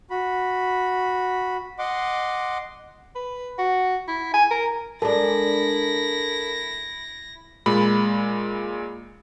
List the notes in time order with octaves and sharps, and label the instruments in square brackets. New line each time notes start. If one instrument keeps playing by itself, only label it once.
[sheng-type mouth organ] F#4 B5
D#5 F#5 C6 D6
[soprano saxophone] B4
F#4
E4
G#5
A#4
[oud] G#3 D4 [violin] E4 A#6 [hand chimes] A4 A#4 A5
[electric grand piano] A#2 G#3 B5